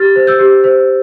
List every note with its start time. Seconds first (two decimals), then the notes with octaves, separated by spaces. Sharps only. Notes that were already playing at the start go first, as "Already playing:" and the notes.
Already playing: G4 F6 A6
0.16 C5
0.27 E6 G6
0.39 G4
0.64 C5